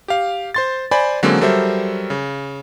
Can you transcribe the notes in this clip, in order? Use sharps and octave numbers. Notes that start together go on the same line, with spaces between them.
G4 F5
C5 C6 A6
C5 D5 G#5 B5
D3 F#3 G#3 A#3 C4 C#4
F#3 G3 A4 A#4 C5 E5
C#3